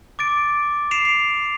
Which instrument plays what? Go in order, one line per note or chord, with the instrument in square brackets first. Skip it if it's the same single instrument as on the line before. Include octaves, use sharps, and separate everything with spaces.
[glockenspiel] D6 A6 D7
C7 D7 E7 F7
C7